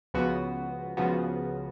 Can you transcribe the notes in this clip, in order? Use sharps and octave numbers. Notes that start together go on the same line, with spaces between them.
C#2 C#3 F3 B3 F#4
C#2 C#3 F3 B3 F#4